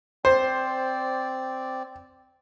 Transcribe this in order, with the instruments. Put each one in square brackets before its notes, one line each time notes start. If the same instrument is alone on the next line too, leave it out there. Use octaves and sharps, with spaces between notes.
[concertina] C4 D5 [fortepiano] C5